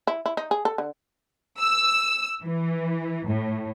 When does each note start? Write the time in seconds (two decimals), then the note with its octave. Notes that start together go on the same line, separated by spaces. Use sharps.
0.07 E4
0.26 E4
0.37 D#4
0.51 G#4
0.65 A4
0.78 D3
1.59 E6
2.43 E3
3.28 A2